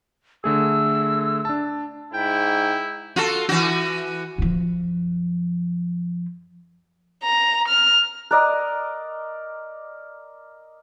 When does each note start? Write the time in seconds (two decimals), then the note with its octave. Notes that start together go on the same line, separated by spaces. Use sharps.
0.44 D3 A3 G#4 E6
1.45 D4 A5
2.14 G#2 E4 G5
3.16 F4 F#4 A4
3.49 E3 F#4
4.38 F#2 F3
7.23 A#5
7.68 F6
8.31 A#4 D5 D#5 A#5 F#6